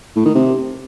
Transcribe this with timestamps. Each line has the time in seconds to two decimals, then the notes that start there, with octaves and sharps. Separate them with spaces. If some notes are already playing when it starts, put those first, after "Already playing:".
0.16 A2
0.25 D#3
0.35 C3